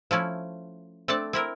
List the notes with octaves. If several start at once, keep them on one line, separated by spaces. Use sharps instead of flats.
F3 A3 C#4 E4
A3 C4 D4 A4 D5 A5
C4 E4 A#4